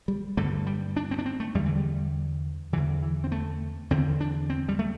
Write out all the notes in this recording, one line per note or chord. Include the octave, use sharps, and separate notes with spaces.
G3
G2 D3 A3
G3
D4
C4
D4
C4
A3
E2 D3 G3
E3
G3
E2 D3 E3
E3
C4
A3
E2 D3 C4
D4
C4
G3
A3